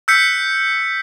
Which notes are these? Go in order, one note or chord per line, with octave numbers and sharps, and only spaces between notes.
E6 F#6 G6 B6 C#7